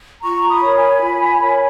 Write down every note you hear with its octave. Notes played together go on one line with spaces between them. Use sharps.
F4 A#5 C#6
B5 D#6
A#4 C#5
G#5 B5
F4
A#4 C#5